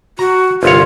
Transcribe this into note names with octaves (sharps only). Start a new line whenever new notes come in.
F#4 A#5
G1 C2 F4 C#5